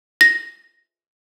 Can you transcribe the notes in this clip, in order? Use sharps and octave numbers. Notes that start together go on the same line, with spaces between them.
A#6